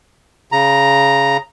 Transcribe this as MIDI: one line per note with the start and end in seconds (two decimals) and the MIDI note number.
0.52 1.37 49
0.52 1.37 82